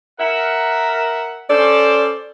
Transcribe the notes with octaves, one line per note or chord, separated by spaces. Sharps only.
A#4 E5 F#5
C#4 A4 C5 D5